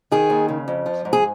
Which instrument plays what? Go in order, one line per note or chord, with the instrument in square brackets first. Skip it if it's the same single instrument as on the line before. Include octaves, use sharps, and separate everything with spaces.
[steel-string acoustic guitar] D#3 G#4
D#2
C#3
F2
F3
G#2
G#4